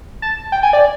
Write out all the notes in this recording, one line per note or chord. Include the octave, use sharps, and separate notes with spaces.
A5
G5
G#5
D5